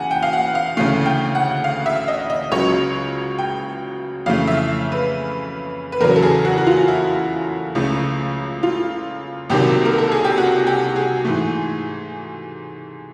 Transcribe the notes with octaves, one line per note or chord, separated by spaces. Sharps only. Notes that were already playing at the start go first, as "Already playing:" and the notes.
Already playing: E2 C#3 F#5 G#5
G5
F5
F#5
F5
D2 C#3 E3 A3 F5
G5
F#5
F5
E5
D#5
D#5
C#2 C#3 F#3 C#5
G5
F2 C#3 E3 A3 F5
E5
B4
B4
E2 C#3 F#3 A#4
A4
G#4
F#4
F#4
F4
E4
C#2 C#3 F3 A3
F4
C2 C3 D#3 F#3 A#3 G4
A#4
A4
G#4
G4
F#4
G4
G#4
G#2 E3 A3